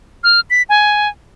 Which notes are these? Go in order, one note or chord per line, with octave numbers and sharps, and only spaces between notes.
F6
B6
G#5